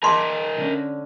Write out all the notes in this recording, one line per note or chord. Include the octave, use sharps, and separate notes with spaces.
A#4 D#5 E5 G#5 A5 C6 D6
D3 C#4